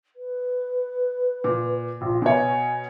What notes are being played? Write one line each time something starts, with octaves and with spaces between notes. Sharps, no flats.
B4
A#2
A#1 F4
B2 C#5 G#5